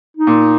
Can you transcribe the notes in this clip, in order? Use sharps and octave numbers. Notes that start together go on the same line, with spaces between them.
D#4
A#2